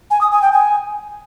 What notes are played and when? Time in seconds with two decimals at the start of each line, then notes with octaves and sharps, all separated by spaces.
0.11 G#5
0.21 D#6
0.32 G#5
0.42 G5
0.53 G#5